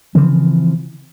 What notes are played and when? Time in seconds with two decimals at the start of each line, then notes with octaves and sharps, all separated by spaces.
0.15 C#3 E3 F3 C4